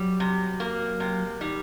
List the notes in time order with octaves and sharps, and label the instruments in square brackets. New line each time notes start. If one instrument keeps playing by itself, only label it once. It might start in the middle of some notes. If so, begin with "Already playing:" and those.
Already playing: [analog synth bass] F#3 [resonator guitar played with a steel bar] G3
[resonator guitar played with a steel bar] C3
A#3
C3
[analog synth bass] D#3 [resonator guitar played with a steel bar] G3